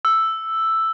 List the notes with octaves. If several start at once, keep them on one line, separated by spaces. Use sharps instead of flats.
E6